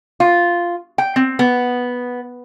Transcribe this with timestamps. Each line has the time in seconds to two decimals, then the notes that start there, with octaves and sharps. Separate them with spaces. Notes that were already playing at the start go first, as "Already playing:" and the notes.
0.20 F4
0.98 G5
1.16 C4
1.39 B3